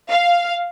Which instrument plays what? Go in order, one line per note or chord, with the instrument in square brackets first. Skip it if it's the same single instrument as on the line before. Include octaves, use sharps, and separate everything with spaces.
[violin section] F5